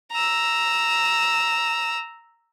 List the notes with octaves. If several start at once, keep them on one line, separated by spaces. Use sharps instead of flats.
A#5 E6